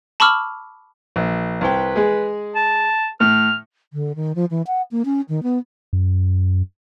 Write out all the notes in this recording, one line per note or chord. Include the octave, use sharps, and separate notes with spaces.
A5 B5 C#6 D6 E6 F6
A#1
C2 B4 G5
G#3 G#4
A5
A2 F6
D3
D#3
F3
E3
F#5
A#3
C#4
D#3
B3
F#2